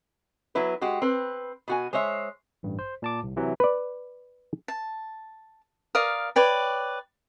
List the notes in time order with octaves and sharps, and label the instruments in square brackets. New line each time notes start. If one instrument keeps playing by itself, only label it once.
[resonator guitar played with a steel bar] F#3 B3 E4 B4
G#3 F#4 G4
C4 B4
B2 F#4 G#5
G#3 C5 C#5 E5
[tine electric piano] A1 G2
C5
A#2 A5 D6
C2
C3 E3 F#3
[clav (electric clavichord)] B4 D5
[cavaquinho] A5
A#4 D5 F5 D#6
B4 C#5 D5 G5